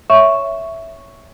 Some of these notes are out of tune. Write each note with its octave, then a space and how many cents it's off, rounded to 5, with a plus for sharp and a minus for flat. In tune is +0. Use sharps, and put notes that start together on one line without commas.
C#5 +0 E5 +0 C#6 +0